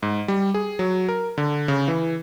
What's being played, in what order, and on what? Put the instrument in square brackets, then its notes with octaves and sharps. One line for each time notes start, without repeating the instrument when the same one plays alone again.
[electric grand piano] G#2
G3
G#4
F#3
A#4
D3
C#3
E3